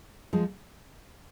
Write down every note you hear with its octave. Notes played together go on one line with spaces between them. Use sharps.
F3 G#3